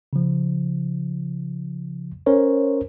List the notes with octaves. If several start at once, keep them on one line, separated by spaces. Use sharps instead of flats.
C#3 F3
C#4 A#4 C5 C#5